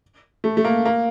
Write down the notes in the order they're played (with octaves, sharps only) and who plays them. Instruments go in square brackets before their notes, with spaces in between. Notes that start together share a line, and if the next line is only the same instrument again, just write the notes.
[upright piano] A3
A3
A#3
A#3